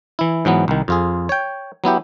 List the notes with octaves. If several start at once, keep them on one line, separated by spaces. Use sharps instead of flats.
E3 E4
G#2 E3 F#3 B3
C2 D#3
F2 F4 G#4
C#5 G5
F#3 B3 E4 G4